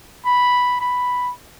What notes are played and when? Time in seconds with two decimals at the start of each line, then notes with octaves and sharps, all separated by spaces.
0.25 B5
0.80 B5